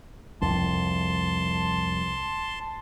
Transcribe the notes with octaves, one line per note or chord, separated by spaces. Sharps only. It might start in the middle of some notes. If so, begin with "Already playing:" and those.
C2 F2 A5 C6